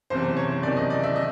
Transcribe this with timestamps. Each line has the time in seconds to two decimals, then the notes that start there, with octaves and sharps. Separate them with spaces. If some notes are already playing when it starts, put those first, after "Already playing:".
0.10 F#1 E2 C3 C5
0.37 C#5
0.63 F#1 E2 C3 D#3 D5
0.77 D#5
0.90 D5
1.04 E5
1.16 D#3 D#5